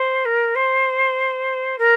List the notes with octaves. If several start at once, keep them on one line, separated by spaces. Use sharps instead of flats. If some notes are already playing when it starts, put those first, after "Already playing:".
Already playing: C5
A#4
C5
A#4